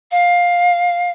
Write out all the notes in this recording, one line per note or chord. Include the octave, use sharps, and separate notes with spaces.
F5